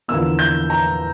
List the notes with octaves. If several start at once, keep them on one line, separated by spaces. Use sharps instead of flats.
E2 D3 F3 A#3 E6
G6
A#5